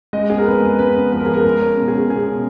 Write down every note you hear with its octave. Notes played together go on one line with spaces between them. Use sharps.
G#3 D#5
B3 G#4
A#4
F2 B4
G#3
B3 B4
F2
F3 B4
A#4
F3 G#4
A#4
G#3 A#4
C#4
B2
G#4
C#4
B2 G#4
B2